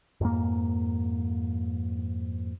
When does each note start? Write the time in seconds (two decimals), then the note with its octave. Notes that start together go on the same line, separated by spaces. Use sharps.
0.21 F2 G#2 A#3